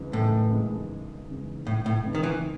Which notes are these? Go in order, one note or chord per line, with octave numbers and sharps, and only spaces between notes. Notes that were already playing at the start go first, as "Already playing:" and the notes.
Already playing: F#1 E2 C#3 G#3 D#4
F#1 A2
E2 C#3 G#3 D#4
F#1
E2 C#3 G#3 D#4
F#1 A2
A2
E2 C#3 G#3 D#4
D#3
E3